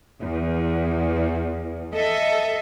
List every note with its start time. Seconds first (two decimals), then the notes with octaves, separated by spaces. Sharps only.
0.20 E2
1.95 A4 D#5 E5